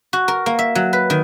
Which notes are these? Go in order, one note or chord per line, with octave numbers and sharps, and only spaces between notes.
F#4
A#4
A#3
E5
F#3
B4
D#3